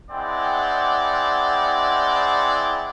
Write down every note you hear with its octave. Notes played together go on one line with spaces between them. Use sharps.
G#3 C4 E4 D5 F#5 G5